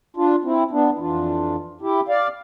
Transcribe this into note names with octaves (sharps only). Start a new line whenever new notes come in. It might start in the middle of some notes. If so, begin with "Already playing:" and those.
D4 F4
C4 E4
B3 D4
E4
F2 E3 D4 F4
E4 G4
D5 F5